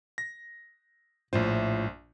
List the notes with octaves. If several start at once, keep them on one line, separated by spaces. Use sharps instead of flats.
A#6
A#1 A2 F4 C5